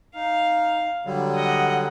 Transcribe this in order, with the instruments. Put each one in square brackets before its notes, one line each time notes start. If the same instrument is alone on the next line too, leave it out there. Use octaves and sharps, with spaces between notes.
[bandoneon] D#4 [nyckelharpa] F5
[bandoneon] D3 F#3 G3
[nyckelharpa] D#5 F#5